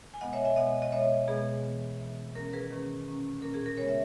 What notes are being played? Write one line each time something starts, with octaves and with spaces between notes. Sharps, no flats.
G#5
B2 G#3 B3 D#5 F#5
C#5 E5
E5 G#5
B2 G#3 B3 D#5 F#5
D#5
B2 G#3 B3 C#5 E5
B2 G#3 B3 G#4
E3 B3
E3 B3
D#3 A#3 C#4 A#4
G#4 B4
D#3 A#3 C#4
A#2 A#3 C#4
A#2 A#3 C#4 A#4
G#4
A#4
C#3 G#3 B3 A#4 C#5
E5